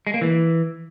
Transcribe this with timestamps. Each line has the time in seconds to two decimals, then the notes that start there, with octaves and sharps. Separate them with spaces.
0.07 G#3
0.14 A#3
0.21 E3